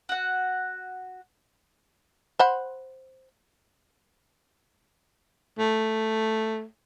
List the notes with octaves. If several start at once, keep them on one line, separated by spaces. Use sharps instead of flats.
F#4 F#5
C5 F#5 B5
A3